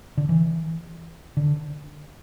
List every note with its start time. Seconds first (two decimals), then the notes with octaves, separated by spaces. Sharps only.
0.17 D3
0.29 E3
1.37 D3